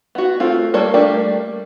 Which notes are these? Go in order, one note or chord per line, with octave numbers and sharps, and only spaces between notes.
B3 F#4
A3 C4 F4
G3 A#3 A4 C#5
G3 A3 A#3 D4 G4